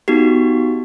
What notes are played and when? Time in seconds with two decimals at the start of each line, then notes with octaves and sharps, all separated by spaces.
0.08 B3 D#4 F#4 G4